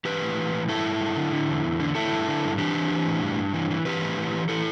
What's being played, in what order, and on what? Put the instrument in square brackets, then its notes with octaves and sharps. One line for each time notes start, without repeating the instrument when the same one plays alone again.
[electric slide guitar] E3 G4 B4
A2
E3
A2
G2 E4 A4
G2
G2
D3
D3
E2
E2
D3
D3 E4 A4
G2
D3
G2
E3 D4 G4
E3
E3
A2
G2
G2
E3
E3
E3 G4 B4
A2
E3
E3
E3 E4 A4